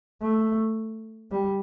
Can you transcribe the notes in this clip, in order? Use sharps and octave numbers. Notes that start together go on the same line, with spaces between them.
A3
G3